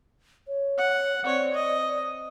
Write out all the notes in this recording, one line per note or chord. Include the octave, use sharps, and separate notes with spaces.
C#5
F#5
C4 C#5 D5
D#5